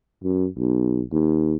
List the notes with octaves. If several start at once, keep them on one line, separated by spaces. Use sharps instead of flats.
F#2
B1
D#2